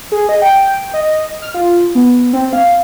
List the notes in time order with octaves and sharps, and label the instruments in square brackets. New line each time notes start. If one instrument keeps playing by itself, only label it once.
[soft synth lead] G#4
D#5
G5
D#5
F6
F4
B3
C4
F5